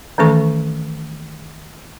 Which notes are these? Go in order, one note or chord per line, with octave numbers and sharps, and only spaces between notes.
D#3 E3 A3 C#4 A4 C#6